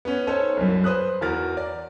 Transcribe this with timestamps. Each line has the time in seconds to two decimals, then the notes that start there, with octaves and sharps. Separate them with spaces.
0.05 B3 C#4
0.27 C#4 D#4 A4 C5 C#5
0.57 C2 F#2
0.84 B4 C5 D#6 F#6
1.21 E2 B3 F#4 A#4 F6 A6
1.57 D5